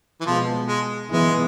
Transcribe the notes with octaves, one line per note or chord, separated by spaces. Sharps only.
E3
B2 F3 G#3 B3
G#3
E3 G#3 B3